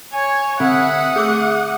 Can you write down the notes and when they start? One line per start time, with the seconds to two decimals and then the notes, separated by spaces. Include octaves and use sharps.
0.13 C#5 G#5
0.60 D3 C4 E5 F#5 D#6
1.16 A3 G#4 D6 E6